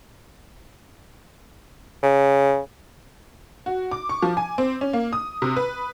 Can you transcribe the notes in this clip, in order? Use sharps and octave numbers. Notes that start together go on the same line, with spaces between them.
C#3
F#4
D6
C#6
F3
G#5
C4
C#4
A#3
D#6
C3
B4